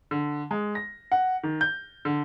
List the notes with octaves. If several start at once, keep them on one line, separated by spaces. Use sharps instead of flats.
D3
G#3
A#6
F#5
D#3
G6
D3